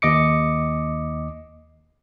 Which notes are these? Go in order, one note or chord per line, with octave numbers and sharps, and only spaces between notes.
D#2 D#5 D6 C#7